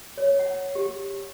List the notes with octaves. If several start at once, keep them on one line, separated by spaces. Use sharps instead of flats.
C#5
F#5
G4